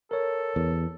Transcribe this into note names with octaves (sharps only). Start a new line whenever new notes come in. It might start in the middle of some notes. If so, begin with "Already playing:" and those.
A4 A#4 C#5
E2